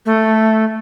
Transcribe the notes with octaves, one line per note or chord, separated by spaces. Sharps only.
A3